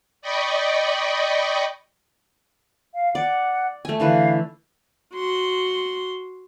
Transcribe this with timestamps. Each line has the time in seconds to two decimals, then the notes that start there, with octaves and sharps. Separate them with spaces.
0.22 D5 D#5 G5 B5 C#6
2.95 F5
3.15 D5 F#5
3.85 A3 G#5
4.00 D3 E3 B4 F5
5.14 F#4 C6